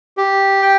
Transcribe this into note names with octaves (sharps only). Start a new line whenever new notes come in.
G4
G5